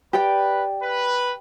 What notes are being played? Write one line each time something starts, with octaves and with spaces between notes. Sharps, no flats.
G4 B4 D5 G5
B4